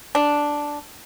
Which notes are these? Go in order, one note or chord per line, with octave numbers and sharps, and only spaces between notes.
D4